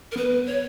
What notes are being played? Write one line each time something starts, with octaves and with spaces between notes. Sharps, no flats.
A#4
B3 B4
C#5